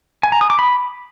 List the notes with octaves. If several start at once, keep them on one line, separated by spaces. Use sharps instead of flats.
G#5
A#5
D#6
D6
B5